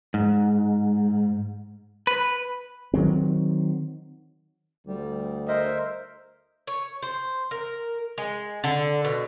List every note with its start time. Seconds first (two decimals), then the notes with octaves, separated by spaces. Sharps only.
0.14 G#2
2.07 B4
2.94 D#3 F#3 C4
4.87 D2 G3
5.48 A#4 C5 D#5 E5
6.67 C#5
7.03 C5
7.51 A#4
8.18 G#3
8.64 D3
9.05 B2